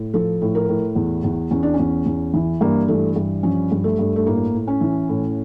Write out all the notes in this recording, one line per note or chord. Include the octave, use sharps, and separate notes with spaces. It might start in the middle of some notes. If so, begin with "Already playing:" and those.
Already playing: A2
F3 A4
A2
A#4
A2
E2
E2
E2 C#4
D4
C#4
E2
E2
E3
G2 A#3
E3 A3
G2
F3 C#4
G2
A3
G2
A3
A2 A#3
A2
C#4
E3
A2